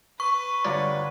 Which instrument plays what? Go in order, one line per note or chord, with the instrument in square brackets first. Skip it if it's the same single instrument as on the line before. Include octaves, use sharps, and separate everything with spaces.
[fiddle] B4 [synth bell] C#6
[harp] G2 D3 A#5 [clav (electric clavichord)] F4 C#5 D5